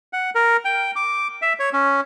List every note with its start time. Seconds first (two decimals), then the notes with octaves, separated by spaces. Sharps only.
0.13 F#5
0.35 A#4
0.65 G5
0.96 D6
1.42 E5
1.60 C#5
1.73 C#4